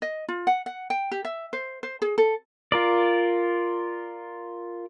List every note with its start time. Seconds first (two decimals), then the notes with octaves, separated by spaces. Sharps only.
0.02 D#5
0.29 F4
0.47 F#5
0.66 F#5
0.90 G5
1.12 G4
1.25 E5
1.53 C5
1.83 C5
2.02 G#4
2.18 A4
2.72 F4 A#4 D5